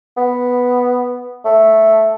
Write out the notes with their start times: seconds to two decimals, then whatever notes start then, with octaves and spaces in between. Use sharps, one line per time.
0.17 B3
1.45 A3